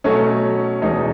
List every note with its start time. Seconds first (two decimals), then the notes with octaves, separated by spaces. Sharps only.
0.04 B2 F#3 A3 C#4
0.82 E2 B2 G#3 D#4